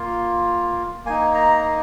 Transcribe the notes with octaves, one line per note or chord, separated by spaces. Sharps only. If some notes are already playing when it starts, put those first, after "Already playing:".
Already playing: A#3 F4
A#3 D#4 G#5
A#5